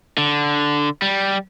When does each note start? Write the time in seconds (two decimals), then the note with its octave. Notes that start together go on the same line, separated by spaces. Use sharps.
0.18 D3
1.02 G3